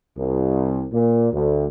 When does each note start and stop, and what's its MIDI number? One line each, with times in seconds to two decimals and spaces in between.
0.17 0.86 36
0.92 1.28 46
1.33 1.67 38